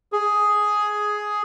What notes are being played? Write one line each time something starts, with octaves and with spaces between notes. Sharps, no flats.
G#4